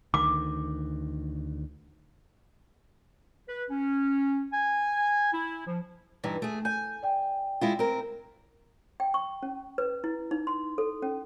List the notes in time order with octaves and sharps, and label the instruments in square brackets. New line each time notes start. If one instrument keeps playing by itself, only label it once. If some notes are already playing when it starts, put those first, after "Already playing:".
[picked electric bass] D2 D#3 [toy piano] D6
[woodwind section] B4
C#4
G#5
E4
F3
[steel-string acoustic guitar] G2 E3 D#4
A3 G#4
[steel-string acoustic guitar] G#5 [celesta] G6
[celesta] D5 G5
[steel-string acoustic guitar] G#3 E4 F4
C4 A#4
[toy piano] G5
C#6
C#4
B4
E4
D#4
C6
A4
C#4